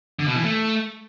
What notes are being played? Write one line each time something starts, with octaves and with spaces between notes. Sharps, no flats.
D3
B2
E3
A3